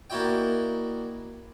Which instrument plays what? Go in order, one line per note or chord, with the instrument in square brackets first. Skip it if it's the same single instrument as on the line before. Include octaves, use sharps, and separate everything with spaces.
[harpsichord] A#3 D4 E4 F#4 D#5 G5